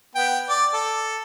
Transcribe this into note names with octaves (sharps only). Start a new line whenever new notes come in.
B3 G5
D5
A4